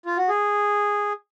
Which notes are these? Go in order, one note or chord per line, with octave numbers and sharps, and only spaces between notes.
F4
F#4
G#4